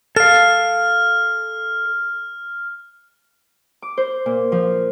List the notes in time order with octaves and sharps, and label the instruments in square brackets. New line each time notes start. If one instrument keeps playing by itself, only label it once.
[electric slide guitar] A4 F5 [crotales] F6
[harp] D6
C5
A#2
F3